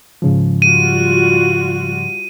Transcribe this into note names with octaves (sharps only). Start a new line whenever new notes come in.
G#2 C#3 F3
G3 F4 F#4 D#7